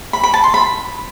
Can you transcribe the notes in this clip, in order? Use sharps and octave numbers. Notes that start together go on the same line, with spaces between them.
B5
B5
A5
C6
B5